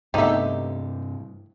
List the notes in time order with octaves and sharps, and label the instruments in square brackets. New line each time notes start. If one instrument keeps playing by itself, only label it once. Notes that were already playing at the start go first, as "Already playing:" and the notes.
[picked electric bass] G2 C3 [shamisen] A3 B3 E5 [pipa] D#4 G4